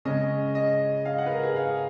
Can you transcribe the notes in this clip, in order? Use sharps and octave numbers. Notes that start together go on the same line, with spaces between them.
C#3 G#3 C#4 D#5
D#5
F5
F#5
B4
A#4
G#4
F5